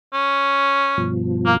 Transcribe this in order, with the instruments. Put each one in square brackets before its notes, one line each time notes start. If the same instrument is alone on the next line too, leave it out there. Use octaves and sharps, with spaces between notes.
[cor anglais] C#4
[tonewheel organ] G2 B2 F3
[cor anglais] A#3